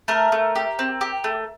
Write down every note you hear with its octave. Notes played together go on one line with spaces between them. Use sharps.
A3 A#4
A3
G4
C4
G4
A3